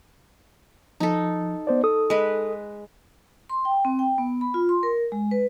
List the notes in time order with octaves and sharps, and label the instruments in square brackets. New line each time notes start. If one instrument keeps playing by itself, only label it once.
[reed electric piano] F3 [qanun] D#4 A4
[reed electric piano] B3 C5 D5
A4 D#6
[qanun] G#3 B4
[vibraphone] C6
G5
C4
G5
B3
B5
F4
C6
A#4
G#3
B4